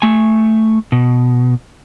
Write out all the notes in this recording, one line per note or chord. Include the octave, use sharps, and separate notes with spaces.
A3 G#5
B2